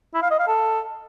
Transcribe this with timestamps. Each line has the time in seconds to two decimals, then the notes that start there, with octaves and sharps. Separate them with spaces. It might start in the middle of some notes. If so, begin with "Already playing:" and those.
0.14 E4
0.22 F5
0.31 D#5
0.39 F5
0.48 A4